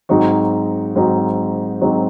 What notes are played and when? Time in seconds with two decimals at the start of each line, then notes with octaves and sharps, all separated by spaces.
0.09 G#2 F#3 C4 D#4 F#4
0.96 G#2 F#3 C4 D#4 F#4
1.81 G#2 F#3 C4 D#4 F#4